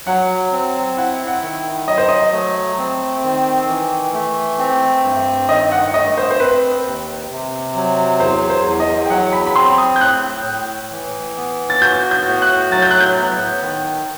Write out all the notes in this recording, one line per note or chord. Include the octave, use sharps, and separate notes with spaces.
F#3 F#5
C4
E4 F#5
F#5
D#3
F#3 D#5
C5
D#5
A3
C4
D#3
E3
A3
C4
G2
D#3 D#5
F#5
A3 D#5
C5
C5
C4 B4
D#2
C3
F#3
E2 C5
C5
E2
D#5
G5
F#3 F#5
B5
B5
C4 C6
D#6
G6
A2 F#6
A2
E3
B3
A6
F#4 G6
G6
A2
F#6
F#3 A6
G6
F#6
G6
B3
D#3